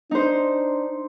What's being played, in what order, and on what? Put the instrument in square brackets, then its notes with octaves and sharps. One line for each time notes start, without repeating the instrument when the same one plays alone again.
[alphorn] D4 [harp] D#4 C5